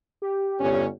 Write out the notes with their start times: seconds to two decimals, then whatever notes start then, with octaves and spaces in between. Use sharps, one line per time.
0.22 G4
0.60 G1 C#4